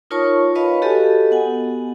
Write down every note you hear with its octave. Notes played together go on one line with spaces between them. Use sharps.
D#4 F4 A#4 C#5 A5 C#6
B4 C#5 D#5 F5 A5 B5
F#4 G4 A4 D#5 G#5
B3 F#5 G#5